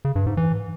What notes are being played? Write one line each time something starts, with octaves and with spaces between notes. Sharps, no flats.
C#3
G2
G#2
E3